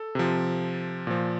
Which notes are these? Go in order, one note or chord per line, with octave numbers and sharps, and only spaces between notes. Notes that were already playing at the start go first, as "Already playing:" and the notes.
Already playing: A4
C3 F3
A#2 F3